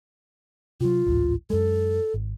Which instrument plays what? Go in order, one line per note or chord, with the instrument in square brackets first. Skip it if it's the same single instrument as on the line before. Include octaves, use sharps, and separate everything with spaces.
[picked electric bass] C3 F#3 [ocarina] F4
[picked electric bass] A1 D2 G#2
[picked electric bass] F#2 G#3 [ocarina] A4
[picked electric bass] G#1